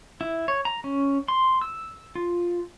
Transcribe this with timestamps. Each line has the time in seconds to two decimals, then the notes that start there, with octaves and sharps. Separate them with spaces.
0.21 E4
0.48 C#5
0.65 A#5
0.84 C#4
1.28 C6
1.62 E6
2.15 F4